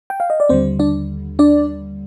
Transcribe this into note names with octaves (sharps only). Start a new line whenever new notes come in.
G5
F5
D#5
D5
D#2 D3 G3 C4 C5
D4 D5
D4 D5